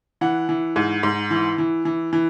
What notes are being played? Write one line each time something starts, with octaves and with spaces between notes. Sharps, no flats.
E3 F#5
E3
G#2
G#2
E3
E3
E3
E3